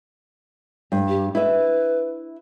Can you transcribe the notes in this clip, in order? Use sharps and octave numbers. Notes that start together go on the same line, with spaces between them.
G2
G4
E4 B4 E5